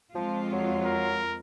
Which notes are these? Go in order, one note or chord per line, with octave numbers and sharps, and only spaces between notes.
F2 F3 G#3 F4
F#3
A#4